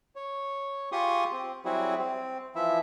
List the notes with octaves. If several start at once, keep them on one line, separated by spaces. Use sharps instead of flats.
C#5
F4 G4 G#4 C6 C#6 D#6
C4
F#3 G3 C4 E4 F#4 G#4
C4
E3 F3 E4 E5